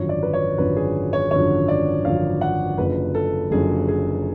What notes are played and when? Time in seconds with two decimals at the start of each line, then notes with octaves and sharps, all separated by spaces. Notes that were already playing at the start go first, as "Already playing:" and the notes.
Already playing: G#1 F#2 D3 F3 C#5
0.09 D5
0.23 B4
0.33 C#5
0.58 G#1 F#2 D3 F3 B4
0.76 G#4
1.13 C#5
1.31 G#1 F#2 D3 F3 C#5
1.68 D5
2.05 G#1 F#2 D3 F3 F5
2.41 F#5
2.78 F#1 F#2 D3 F3 B4
3.15 A4
3.51 F#1 F#2 D3 F3 G#4
3.88 G#4